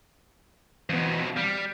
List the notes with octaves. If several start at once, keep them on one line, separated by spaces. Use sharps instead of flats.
F2 B2 E3 B3
G3 F6 B6